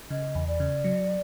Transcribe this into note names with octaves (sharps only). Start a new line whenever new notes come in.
C#3 D#5
E2
D5
C#3
F#3